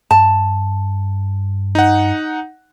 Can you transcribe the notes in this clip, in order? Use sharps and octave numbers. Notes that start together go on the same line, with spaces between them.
G2 A5
D#4 F#5